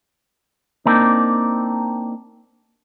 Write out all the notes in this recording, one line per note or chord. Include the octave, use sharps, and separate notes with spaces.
A#3 C4 D4 D#4